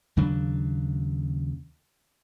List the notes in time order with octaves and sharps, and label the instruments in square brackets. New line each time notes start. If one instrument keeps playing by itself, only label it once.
[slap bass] D#2 C#3 F#3 D4